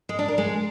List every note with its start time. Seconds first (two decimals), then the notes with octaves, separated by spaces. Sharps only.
0.09 G#3
0.19 D4
0.28 A#4
0.38 G#3